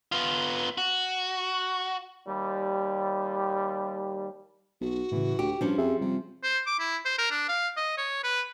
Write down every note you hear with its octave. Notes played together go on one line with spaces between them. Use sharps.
B3 F4
F#4
D#2 G3
B1 F#4
A2 C#3 E3
D2 G4 D6
G2 F3 C#4
F2 G4 G#4 E5
C3 G3
C5
D6
E4
C5
A#4
D4
F5
D#5
C#5
B4